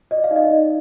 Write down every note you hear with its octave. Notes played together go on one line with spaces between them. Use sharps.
D5 D#5
F5
D#4
D#5
D#4